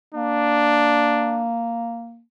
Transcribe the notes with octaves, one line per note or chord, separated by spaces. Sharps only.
A#3 D4